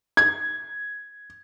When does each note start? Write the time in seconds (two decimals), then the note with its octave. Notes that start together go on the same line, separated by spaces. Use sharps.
0.17 G#6